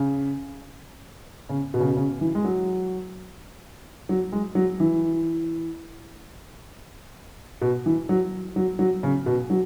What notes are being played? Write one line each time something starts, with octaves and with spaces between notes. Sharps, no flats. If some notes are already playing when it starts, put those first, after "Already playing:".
Already playing: C#3
C#3
B2
C#3
B2
C#3
E3
G#3
F#3
F#3
G#3
F#3
E3
B2
E3
F#3
F#3
F#3
C#3
B2
F#3